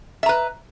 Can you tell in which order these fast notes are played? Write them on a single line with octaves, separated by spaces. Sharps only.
E5 A#5 B4